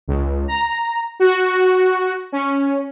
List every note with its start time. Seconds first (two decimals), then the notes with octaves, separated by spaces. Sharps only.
0.08 C#2
0.48 A#5
1.20 F#4
2.32 C#4